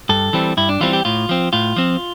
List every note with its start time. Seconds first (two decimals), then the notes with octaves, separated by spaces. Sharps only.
0.09 G2 A4
0.33 E3 G3 C4
0.57 G2 E4
0.69 D4
0.81 E3 G3 C4 F4
0.93 G4
1.05 A2 F4
1.29 F3 C4
1.53 A2 F4
1.76 F3 C4